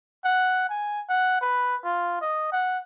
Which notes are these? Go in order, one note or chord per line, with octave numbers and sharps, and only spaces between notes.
F#5
G#5
F#5
B4
F4
D#5
F#5